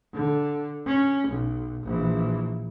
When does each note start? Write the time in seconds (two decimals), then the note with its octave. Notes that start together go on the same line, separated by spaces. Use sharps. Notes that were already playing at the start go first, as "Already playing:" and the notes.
0.14 D3
0.87 C#4
1.28 B1
1.84 A#1 E3